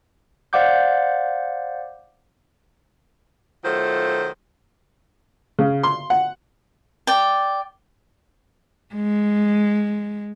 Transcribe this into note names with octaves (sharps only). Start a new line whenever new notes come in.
C5 D5 F5 F#5 D6 G6
D#3 F#3 A3 F4 C5
C#3
C6
F#5
D5 G5
G#3